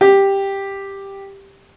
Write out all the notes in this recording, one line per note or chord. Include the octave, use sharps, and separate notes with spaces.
G4